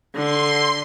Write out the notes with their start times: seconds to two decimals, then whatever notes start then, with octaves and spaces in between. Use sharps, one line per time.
0.15 D3 C6